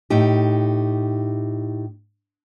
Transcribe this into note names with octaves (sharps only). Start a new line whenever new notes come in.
A2 D#4 G4